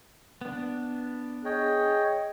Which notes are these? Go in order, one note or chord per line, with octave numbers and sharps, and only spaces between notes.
B3 D4
G#4 C#5 D#5 G5